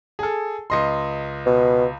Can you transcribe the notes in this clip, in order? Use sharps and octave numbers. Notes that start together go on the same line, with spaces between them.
G#4 A4
C#2 D#5 C6
B2